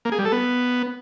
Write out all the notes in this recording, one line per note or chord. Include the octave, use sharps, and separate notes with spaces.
A#3
G#4
G3
A4
B3